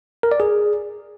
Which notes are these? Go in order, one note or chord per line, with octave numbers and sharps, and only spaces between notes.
A#4
D5
G#4